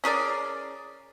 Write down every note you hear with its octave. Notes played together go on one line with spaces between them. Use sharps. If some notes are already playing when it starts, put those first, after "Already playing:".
C#4 G#4 A#4 D5